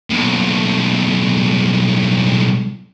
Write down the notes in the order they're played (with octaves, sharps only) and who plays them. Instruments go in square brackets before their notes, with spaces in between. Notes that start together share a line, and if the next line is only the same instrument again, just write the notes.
[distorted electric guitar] B1 A2